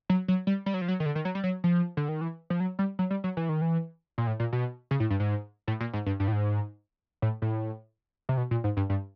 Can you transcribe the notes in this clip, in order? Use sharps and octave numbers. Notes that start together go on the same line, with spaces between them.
F#3
F#3
G3
G3
F#3
F3
F#3
D#3
D3
D#3
F#3
G3
F#3
F3
D3
D#3
E3
F3
F#3
G3
F#3
G3
F#3
E3
D#3
E3
A#2
A2
A#2
B2
C#3
A2
G2
G#2
A2
A#2
G#2
G2
G2
A2
G#2
A2
A2
C3
B2
A#2
G#2
G2
G2